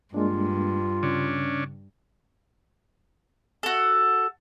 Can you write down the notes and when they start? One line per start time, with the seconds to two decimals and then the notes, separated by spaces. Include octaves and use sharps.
0.14 G2 G#3 A#3 D4 F4
1.03 C#3 C#4 D4
3.63 F#4 A4